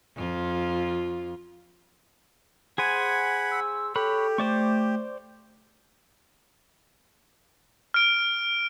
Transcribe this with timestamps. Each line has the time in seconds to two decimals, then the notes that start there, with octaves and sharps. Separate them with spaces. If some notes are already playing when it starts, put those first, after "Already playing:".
0.16 F2 F4
2.78 G#4 C5 F#5 G#5 B5 G#6
3.51 E6
3.96 G4 A4 C#5 B5 F#6
4.38 A3 C5 D5 C#6
7.94 F6 D7